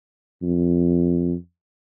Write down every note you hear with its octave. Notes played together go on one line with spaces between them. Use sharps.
F2